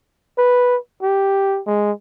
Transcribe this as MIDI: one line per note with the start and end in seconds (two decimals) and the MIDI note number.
0.38 0.78 71
1.02 1.61 67
1.67 1.92 56